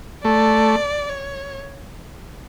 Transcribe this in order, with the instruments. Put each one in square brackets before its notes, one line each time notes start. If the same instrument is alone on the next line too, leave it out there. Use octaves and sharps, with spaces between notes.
[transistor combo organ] A3 [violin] D5
[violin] C#5